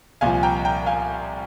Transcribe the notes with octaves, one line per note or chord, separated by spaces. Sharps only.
C2 A#2 F3 F5 G#5
G5 A#5
G5 A#5
F5 G#5